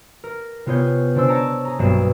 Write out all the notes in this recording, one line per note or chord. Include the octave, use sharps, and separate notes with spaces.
A#4
C3 B3 F4 G#4 C#5 G6
C#3 D4 C5 E6
C#5 A5 A#5 A#6 D7
G#4 A#5
B1 G2 A#3 C7 E7